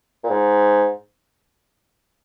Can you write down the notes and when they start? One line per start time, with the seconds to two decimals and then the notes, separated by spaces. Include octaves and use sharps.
0.24 A#2
0.30 G#2